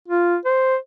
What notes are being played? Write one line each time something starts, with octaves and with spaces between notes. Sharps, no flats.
F4
C5